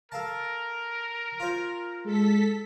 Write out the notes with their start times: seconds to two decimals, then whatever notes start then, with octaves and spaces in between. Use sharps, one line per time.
0.12 A4 A#4 F5 A5
1.40 F4 C5
2.05 G#3 A4 B6